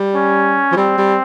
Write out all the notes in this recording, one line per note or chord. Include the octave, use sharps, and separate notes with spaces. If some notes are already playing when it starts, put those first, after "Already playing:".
Already playing: G3
C#4
F3
G3 C4
G3